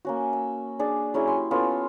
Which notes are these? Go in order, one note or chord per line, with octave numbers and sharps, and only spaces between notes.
A#3 C#4 F#4
E6
D4 G#4 D5
F#3 C#4 E4 G#4
G4 C6
B3 C#4 F4 A4